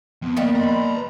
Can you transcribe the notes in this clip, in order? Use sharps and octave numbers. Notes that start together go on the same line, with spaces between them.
F2 B3
D#3 G3 A#3
A#5 B5
B4